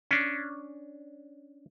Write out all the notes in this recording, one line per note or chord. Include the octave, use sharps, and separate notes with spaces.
C#4 D4